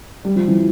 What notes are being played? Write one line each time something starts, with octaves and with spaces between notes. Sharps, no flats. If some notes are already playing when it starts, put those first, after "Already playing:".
G3
F3
E3